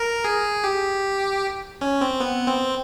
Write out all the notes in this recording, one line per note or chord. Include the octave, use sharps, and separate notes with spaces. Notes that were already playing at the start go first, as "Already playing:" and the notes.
Already playing: A#4
G#4
G4
C#4
C4
B3
C4